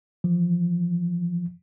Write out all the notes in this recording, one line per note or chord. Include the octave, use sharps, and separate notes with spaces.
E3 F3